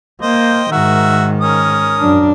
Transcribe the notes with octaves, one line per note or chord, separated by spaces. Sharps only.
A#3 C5 D#5 G5
G#2 D#3 F#4 A#4 E5
C#4 A#4 D#6
F#2 D4